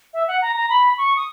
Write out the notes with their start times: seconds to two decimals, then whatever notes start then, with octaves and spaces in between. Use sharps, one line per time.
0.13 E5
0.28 F#5
0.42 A#5
0.56 A#5
0.70 B5
0.98 C#6
1.16 D#6